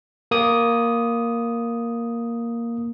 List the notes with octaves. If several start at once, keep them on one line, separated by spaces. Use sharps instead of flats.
A#3 D#6